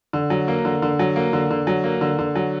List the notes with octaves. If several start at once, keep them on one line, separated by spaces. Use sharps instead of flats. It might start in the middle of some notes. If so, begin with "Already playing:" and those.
D3
F#3
A#3
D3
D3
F#3
A#3
D3
D3
F#3
A#3
D3
D3
F#3